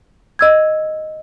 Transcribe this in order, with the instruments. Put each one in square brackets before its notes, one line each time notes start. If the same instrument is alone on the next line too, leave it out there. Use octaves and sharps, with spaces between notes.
[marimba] D#5 E6 G#6